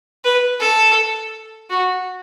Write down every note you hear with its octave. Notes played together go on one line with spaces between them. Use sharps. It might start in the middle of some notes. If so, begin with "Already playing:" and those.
B4
A4
F#4